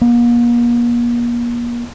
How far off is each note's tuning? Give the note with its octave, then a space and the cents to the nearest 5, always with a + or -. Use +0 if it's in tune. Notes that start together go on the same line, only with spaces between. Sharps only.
A#3 +40